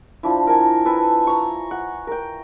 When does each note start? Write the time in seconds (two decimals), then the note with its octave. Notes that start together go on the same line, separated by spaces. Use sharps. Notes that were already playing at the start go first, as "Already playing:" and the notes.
0.23 F3 D4 E4
0.47 A#4 G#5
0.85 A4 B4 G#5
1.27 A#5 C#6
1.71 F#5
2.07 A#4 G5